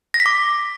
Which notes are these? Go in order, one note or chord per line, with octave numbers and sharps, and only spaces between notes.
A#6
B6
D6